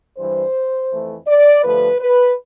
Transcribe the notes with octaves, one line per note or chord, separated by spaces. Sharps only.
G2 E3 G3 C5
F2 E3 A3
D5
G2 D3 F3 A3 B4
B4